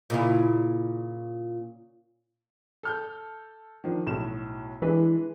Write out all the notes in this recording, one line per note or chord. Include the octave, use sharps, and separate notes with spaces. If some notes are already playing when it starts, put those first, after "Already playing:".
A#2 C#3 E4
A4 F6 G6
D#3 F3 D4
B1 A2 E7
E3 G#3 D4 B4